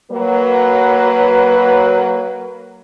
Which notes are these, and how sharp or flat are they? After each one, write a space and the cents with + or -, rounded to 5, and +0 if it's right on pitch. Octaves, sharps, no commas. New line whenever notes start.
F#3 +15 A#3 -5 B4 -5